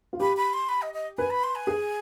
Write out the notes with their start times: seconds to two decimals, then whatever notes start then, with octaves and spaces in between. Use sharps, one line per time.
0.13 F4
0.20 G4 B5
0.37 B5
0.53 C6
0.69 B5
0.82 D#5
0.94 D#5
1.18 B4 G#5
1.30 B5
1.43 C6
1.55 G#5
1.67 G#4